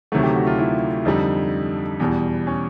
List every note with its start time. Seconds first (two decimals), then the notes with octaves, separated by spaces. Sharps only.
0.12 D2 C3 D#3 F#3 A3 F#4
0.23 G4
0.36 F#4
0.47 F4
0.58 E4
1.05 F2 D3 G3 D#4
2.00 E2 B2 G3
2.47 C#4